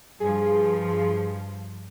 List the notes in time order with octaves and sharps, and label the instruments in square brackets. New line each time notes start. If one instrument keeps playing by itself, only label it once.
[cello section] G2 F3 [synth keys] G#4